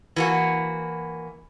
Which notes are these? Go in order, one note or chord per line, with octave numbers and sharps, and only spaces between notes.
E3 A#3 F#4